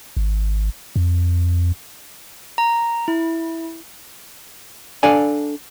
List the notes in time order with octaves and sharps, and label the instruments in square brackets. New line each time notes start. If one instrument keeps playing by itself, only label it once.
[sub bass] G#1
F2
[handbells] A#5
E4
[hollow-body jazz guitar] D4 A4 D5 F5 G#5